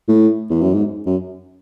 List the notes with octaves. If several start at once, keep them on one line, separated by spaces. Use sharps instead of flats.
A2
E2
F#2
G#2
F#2